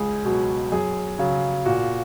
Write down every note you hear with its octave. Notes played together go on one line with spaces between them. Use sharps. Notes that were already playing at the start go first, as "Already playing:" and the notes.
Already playing: C#2 G#4
B2 F#3
F#2 G#4
C#3 F#3
A#2 F#4